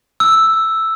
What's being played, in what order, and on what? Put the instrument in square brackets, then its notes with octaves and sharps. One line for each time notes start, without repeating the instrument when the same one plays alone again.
[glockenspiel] E6